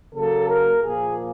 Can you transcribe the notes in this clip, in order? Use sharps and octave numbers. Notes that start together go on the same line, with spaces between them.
C#3 F#3 A#3 A4
A#4
A#2 F3 A#3 G#4